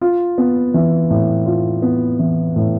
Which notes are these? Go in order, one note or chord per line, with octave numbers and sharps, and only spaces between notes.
F4
B3
E3
A2
F4
B3
E3
A2